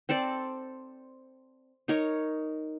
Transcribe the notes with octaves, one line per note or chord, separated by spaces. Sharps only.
C4 A4 C5 D5
D#4 A#4 C#5